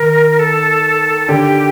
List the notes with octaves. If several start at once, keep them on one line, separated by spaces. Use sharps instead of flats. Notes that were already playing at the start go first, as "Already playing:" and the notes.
Already playing: D#3 A#4
A4
D3 G4